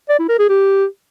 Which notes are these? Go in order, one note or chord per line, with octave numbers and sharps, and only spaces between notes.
D5
E4
A#4
G#4
G4